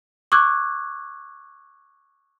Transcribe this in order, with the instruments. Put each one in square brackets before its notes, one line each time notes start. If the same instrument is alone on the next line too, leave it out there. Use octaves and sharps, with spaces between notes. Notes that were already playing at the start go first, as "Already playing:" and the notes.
[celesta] C#6 D6 E6 F#6 G#6